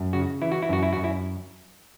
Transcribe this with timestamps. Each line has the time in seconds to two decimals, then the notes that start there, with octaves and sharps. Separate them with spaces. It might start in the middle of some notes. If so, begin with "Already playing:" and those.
Already playing: F#2
0.13 C#3 F#4
0.42 E3 E4
0.52 F#4
0.62 E4
0.69 F#2 F#4
0.83 E4
0.93 F#2 F#4
1.04 E4